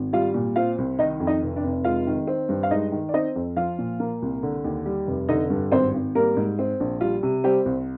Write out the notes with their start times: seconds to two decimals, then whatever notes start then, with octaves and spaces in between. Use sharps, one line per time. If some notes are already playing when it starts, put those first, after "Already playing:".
Already playing: G#1
0.13 G3 F4 F5
0.34 A#2
0.56 C4 F4 F5
0.78 C2
0.99 D#3 D#4 D#5
1.20 F2
1.27 D#4 D#5
1.43 F1
1.56 D4 D5
1.63 F1
1.84 G#3 F4 F5
2.07 D#3
2.27 C4
2.49 G2
2.63 F5
2.71 G#3 D#4 D#5
2.92 D#3
3.09 D5
3.14 C4 D#4 D#5
3.36 F2
3.57 F3 F4 F5
3.79 A#2
4.00 A#3
4.22 C2
4.43 D3
4.64 D#2
4.86 G3
5.07 F1
5.29 D3 D#4 D#5
5.50 G2
5.72 G#1 C4 C5
5.94 G#1
6.15 G3 A#3 A#4
6.37 G#2
6.59 C4
6.80 A#1
7.01 G3 F4
7.23 C3
7.44 G3 C4 G4
7.66 C2